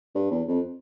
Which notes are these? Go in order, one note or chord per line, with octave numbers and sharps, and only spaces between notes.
G2
E2
F2